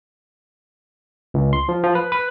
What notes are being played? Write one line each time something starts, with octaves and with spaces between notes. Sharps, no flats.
C#2
C6
F3
F3
B4
B4